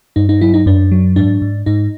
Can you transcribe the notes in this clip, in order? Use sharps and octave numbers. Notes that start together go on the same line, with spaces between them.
G2 D#4
D#4
F#3 E4
D#4
F#2 D4
F#3
G#2 D4
G#2
G#2 D#4